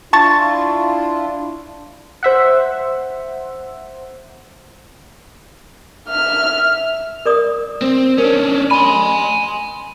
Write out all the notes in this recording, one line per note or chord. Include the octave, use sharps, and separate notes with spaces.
D4 E4 F4 A5 C#6 A6
C5 E5 F#5
E5 F6
A#4 D5 D#6
C4
C#4 D4 A#4
G#5 B5 C6